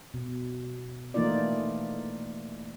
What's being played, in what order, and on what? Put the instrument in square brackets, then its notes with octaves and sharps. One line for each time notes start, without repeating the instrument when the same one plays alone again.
[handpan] B2
E3 A3 A#3 D#4 F4 D5